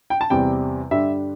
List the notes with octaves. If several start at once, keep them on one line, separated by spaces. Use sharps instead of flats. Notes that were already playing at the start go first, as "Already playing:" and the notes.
G5
A5
E2 C3 G3 C4 G5
G2 D3 G3 E5